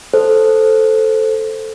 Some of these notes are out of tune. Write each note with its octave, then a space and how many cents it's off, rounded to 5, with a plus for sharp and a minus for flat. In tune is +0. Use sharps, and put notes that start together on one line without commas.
A4 +0 C5 +0